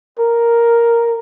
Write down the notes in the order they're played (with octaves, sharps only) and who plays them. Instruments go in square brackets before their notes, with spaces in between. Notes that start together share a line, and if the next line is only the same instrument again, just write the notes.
[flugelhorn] A#4